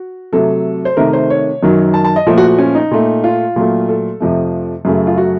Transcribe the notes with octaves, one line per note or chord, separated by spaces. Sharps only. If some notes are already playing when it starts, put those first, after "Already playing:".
Already playing: F#4
C3 F#3 A3 A4
C5
C3 D#3 A3 A#4
C5
C#5
F#2 D#3 F#3
A5
A5
D#5
A#2 F3 A3 A4
F#4
F#4
C#4
D#4
A#2 A3
F4
A#2 F#3 A3
A4
F2 C3 F3 A3
F#2 C#3 F#3 A3
F4
F#4